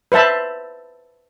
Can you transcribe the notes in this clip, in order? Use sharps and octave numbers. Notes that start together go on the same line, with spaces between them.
B4 C5 E5 A5 B5